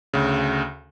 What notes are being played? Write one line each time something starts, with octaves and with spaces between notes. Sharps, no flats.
D2 C#3